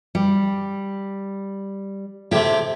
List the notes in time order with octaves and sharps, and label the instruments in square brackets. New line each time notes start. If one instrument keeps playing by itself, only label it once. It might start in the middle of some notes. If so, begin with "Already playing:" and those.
[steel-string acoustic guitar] G3
[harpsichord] A2 C3 [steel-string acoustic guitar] G4